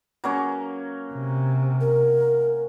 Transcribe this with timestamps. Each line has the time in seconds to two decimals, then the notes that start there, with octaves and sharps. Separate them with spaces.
0.24 F#3 A#3 C#4
1.13 C3
1.81 A#4